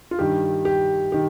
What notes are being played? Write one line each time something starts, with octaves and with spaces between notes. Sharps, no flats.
F4
G2 D#3 G3 G4
G4
D#3 G4